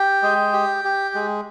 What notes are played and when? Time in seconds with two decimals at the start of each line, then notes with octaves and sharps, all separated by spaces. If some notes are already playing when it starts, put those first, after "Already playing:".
Already playing: G4 G5
0.22 G#3
0.53 G4
0.84 G4
1.15 G#3